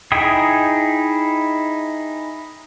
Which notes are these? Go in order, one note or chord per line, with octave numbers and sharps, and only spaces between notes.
D#4 E4 G#4 G5 D#6